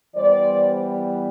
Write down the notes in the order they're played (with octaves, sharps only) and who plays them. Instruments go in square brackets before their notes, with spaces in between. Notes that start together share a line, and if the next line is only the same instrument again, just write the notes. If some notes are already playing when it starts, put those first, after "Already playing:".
[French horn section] E3 G3 B3 C5 D5